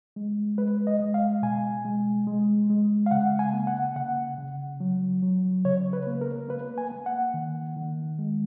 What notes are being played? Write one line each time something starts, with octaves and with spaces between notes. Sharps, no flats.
G#3
G#3 B4
D#5
G#3
F5
B2 G#5
G#3
G#3
G#3
F5
C#3 F#5
G#5
A#3
F#5
C#3 F#5
C#3
F#3
F#3
C#3 C#5
B4
A#3
A#4
A#3 B4
G#5
A#3
F#5
D#3
D#3
G#3